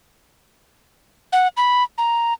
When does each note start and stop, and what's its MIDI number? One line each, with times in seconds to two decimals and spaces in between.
1.33 1.48 78
1.57 1.83 83
1.98 2.34 82